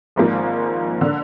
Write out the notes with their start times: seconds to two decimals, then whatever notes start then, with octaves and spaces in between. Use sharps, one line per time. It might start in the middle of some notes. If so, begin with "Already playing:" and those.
0.16 G#1 G#2 F3 A#3 F4
1.01 D3